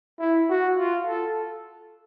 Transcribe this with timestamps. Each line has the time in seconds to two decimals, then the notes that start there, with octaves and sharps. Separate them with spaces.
0.19 E4
0.49 F#4
0.77 F4
1.07 A4